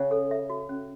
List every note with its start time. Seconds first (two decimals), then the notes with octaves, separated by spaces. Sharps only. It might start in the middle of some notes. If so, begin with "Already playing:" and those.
Already playing: C#3 C#4
0.11 A4
0.31 E5
0.50 F#4
0.69 C#4